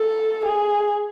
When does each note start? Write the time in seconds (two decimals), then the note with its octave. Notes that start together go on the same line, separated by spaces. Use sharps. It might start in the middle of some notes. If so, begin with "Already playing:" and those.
Already playing: A4
0.45 G#4